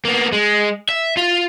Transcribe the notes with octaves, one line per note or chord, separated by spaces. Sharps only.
A#3 B3
G#3
E5
F4